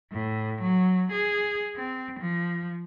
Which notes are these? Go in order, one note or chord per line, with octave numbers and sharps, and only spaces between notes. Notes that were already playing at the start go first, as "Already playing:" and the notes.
A2
F#3
G#4
C4
F3